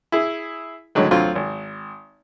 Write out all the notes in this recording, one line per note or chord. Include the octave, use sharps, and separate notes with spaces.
E4 G#4
A2 D3 D#3 F#3 G#3
D2 D3 F#3 C4 F4 C6
G#1